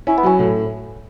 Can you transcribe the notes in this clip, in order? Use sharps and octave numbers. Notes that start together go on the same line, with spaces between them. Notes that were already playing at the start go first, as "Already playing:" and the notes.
C#4 E4
B3
F#3 C#4
A2